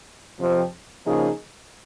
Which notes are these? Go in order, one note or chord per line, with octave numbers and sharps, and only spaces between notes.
F2 C3 F3 C4
C#3 F3 A#3 D#4 G#4